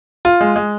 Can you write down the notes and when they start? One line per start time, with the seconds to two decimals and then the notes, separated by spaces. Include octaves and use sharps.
0.25 F4
0.41 G#3
0.56 G#3